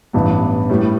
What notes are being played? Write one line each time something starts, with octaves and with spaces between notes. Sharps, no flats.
A1 G2 E3 B3
A2 G3 B3